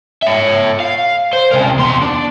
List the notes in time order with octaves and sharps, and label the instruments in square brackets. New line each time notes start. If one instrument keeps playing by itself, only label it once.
[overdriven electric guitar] C#5 E5
F5
C5
C3 A#4
E2 C6
D4